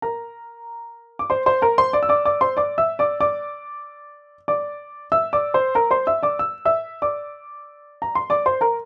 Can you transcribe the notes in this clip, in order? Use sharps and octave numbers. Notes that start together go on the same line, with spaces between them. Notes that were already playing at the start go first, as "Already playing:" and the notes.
A#4 A#5
D6
C5 C6
C5 C6
A#4 A#5
C5 C6
D5 D6
E6
D5 D6
D5 D6
C5 C6
D5 D6
E5 E6
D5 D6
D5 D6
D5 D6
E5 E6
D5 D6
C5 C6
A#4 A#5
C5 C6
E5 E6
D5 D6
E6
E5 E6
D5 D6
A#5
C6
D5 D6
C5 C6
A#4 A#5